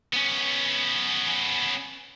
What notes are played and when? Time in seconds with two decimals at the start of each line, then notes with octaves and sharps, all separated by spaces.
0.13 B3 C#4